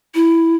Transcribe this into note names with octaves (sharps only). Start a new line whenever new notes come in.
E4